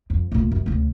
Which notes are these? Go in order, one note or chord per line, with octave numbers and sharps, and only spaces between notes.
F2
D2 A#2
F#2
D2 C#3